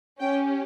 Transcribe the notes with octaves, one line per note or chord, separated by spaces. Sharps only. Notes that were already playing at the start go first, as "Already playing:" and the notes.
C#4 G4 G5